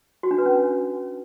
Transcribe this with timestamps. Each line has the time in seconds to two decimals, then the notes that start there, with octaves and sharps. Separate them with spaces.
0.23 F#4
0.31 D4
0.38 B4
0.46 C#4
0.53 D4